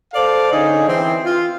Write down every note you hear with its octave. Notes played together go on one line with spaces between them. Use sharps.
A4 C5 D5 F5
D3 C#4 D#4 G#4
E3 C4
F4